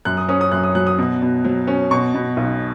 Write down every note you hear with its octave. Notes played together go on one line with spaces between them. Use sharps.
F#2 F#6
D#6
C#4 D#6
D#6
F#2 F#6
D#6
F#3 F#6
D#6
B2
B2
F#3
C#4
B2 C#6
B2
B1